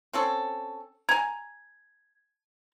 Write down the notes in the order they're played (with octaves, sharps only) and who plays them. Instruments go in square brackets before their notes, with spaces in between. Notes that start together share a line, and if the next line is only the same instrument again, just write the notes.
[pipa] C4 C#4 A4
[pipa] G#5 A#5 [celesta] G#6